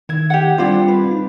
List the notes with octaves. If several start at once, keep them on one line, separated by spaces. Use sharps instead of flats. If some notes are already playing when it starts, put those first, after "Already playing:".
D#3 E4 G#6
G4 F#5
G3 C4 D4 E4 F4 C5
B4
D#4